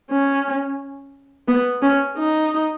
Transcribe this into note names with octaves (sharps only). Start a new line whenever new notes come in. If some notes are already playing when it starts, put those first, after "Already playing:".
C#4
B3
C#4
D#4